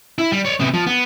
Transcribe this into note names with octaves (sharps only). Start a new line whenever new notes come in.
E4
G3
C#5 D5
C3 B3
F3
B3